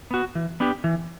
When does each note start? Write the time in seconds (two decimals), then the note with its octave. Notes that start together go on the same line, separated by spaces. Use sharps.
0.11 B3 F#4
0.35 E3
0.60 B3 D4 G4
0.84 E3